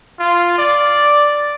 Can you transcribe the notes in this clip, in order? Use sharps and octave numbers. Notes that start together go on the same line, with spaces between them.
F4
D5